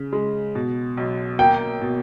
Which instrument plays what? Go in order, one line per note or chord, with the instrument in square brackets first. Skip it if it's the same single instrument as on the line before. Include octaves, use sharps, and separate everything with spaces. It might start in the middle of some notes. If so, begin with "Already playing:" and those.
Already playing: [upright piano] C#3
G#3
B2
B1
[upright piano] A#3 [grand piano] G5
[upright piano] B2